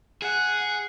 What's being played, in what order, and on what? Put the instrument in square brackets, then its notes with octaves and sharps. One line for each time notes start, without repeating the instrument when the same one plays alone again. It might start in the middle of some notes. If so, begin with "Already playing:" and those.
[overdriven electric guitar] G#4 [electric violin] F#5